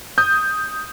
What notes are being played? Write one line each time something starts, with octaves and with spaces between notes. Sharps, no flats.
D#6 G6